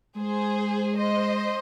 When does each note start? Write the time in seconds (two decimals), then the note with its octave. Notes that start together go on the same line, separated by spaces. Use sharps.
0.16 G#3 G#4 C5
0.97 C5 D#5